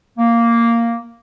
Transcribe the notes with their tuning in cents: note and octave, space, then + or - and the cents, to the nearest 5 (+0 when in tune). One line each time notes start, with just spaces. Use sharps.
A#3 -5